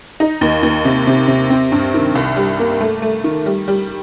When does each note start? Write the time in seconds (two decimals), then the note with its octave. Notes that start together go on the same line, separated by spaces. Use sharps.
0.20 D#4
0.41 D#2
0.63 D#2
0.85 C3
1.07 C3
1.28 C3
1.50 C4
1.72 G2
1.94 D#3
2.15 C2
2.36 G3
2.59 A#3
2.81 A3
3.02 A3
3.24 D#3
3.46 G3
3.68 G3